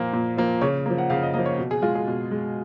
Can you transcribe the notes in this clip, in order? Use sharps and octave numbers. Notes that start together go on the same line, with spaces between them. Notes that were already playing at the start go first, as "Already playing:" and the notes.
Already playing: A#2 F3 A#3
A#2
F3 A#3
C#3 C#5
F3 A#3
F#5
C#3 F5
D#5
F3 A#3 D#5
C#5
B2
G#4
G#3 F4
G#4
B2
G#3